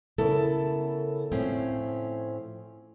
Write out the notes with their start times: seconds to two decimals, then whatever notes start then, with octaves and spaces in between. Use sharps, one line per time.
0.18 C#3 B3 E4 A4 A#4
1.32 A2 F3 A3 C4 C#4